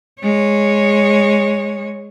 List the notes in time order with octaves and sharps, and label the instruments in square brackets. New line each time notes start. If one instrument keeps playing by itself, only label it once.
[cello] G#3 C#5